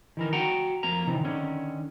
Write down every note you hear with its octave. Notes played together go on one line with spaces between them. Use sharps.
D#3 E3 A#4
F#4 F#5 G5 A#5
F2 A#3 A#5
C3 D#3 E3
D3 D#3 C#4